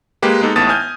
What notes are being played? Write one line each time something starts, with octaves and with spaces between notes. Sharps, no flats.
G#3 A#3 G4 B4
G#3 B3 D#4 A4
A1 A2 B3 A5 D#6 A6
G#5 F6 G6 G#6